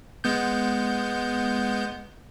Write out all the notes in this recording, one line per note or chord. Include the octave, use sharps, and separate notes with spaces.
G#3 B3 G6